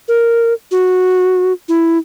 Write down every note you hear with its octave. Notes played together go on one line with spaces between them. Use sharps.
A#4
F#4
E4